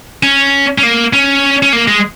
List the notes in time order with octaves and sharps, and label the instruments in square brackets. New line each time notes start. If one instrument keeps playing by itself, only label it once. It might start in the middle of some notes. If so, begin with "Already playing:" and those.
[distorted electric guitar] C#4
C#4
A#3
C#4
C#4
A#3
G#3